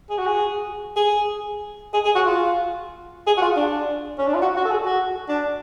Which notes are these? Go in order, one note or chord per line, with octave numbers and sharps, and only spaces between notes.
G#4
F#4
G#4
G#4
G#4
G#4
F#4
F4
G#4
F#4
F4
D4
C#4
D4
F4
F#4
F#4
A4
G#4
F#4
D4